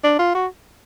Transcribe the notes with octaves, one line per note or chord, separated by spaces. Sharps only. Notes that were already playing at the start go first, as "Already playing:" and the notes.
D4
F4
F#4